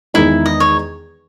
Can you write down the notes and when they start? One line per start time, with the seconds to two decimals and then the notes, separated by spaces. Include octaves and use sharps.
0.14 E2 D#3 G#3 D#4 E4
0.46 D#5
0.60 C#5